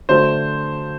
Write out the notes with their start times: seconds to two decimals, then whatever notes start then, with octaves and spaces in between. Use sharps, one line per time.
0.09 D3 F#3 A3 C5